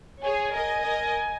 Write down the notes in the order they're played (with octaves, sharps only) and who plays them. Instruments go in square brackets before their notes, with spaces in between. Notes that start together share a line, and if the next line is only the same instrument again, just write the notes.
[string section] G#4 C#5 [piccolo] G#5
[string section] A#4 D#5
A#4 D#5